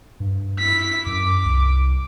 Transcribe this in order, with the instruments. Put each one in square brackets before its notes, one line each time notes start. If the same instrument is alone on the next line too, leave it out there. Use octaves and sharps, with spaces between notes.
[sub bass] G2
[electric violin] E4 B6
[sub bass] F#2 [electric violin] D6
[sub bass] C2